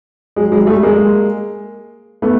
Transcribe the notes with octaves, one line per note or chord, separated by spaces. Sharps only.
F#3 G#3
F#3 G#3
G3 A3
G#3 A#3
A3 B3